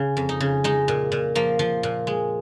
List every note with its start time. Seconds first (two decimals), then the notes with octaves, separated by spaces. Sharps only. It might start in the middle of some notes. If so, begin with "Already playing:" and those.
Already playing: C#3
0.17 F2
0.29 D#4
0.40 C#3
0.64 G#3 D#4
0.88 A#2
1.12 A#2
1.35 F3 A#3
1.59 F3
1.83 A#2
2.07 G#3